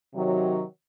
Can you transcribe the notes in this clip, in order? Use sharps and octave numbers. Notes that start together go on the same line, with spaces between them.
C3 D#3 F#3